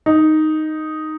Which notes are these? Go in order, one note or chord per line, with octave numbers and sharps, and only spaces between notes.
D#4